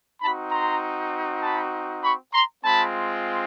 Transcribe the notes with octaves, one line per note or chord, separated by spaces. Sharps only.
C4 D#4 F#4 A5 B5
A#5 C6
A5 B5
B5 C#6
A#5 C6
G#3 C4 F4 A5 B5